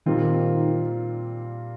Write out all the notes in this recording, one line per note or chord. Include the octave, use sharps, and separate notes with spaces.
A#2 D#3 G3 C4 F4